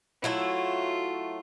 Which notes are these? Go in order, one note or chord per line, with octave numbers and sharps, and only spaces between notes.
F#3 A3 E4 F4